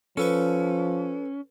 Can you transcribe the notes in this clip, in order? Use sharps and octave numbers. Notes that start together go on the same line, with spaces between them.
F3 C#4 A4 B4 C#6